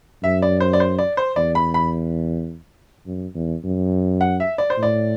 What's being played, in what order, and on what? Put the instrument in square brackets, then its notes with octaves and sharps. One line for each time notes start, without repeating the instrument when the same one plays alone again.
[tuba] F#2 [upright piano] E5
[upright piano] D5
C5
D5
C5
D5
C5
[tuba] E2 [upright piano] D5
[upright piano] B5
B5
[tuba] F#2
E2
F#2
[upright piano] F#5
E5
D5
C5
[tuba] A2
[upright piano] D5